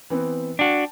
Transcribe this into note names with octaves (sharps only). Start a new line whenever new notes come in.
E3 B3 C4
D4 F#4 G5 A5